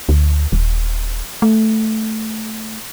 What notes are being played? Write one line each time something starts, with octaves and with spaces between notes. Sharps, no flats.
D2
D#1
A3